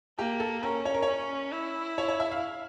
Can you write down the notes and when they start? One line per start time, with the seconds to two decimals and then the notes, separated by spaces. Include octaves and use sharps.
0.19 A#3 G4
0.40 A4
0.63 C#4 A#4
0.85 C#5
0.94 A#4
1.02 C#4 C#5
1.52 E4
1.98 C#5
2.08 C#5
2.20 E5
2.32 F5